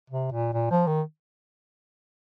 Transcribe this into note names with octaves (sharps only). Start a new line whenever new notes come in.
C3
A#2
A#2
F3
D#3